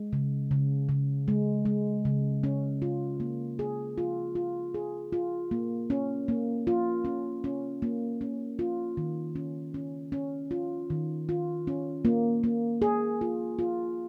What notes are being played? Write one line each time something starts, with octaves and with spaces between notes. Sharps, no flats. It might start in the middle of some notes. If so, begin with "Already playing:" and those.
Already playing: G#3
C#3
C#3
C#3
G#3
G#3
C#3
C#4
F4
A#3
G#4
F4
F4
G#4
F4
A#3
C#4
A#3
F4
C#4
C#4
A#3
C#4
F4
D#3
C#4
C#4
C#4
F4
D#3
F4
C#4
A#3
A#3
G#4
F4
F4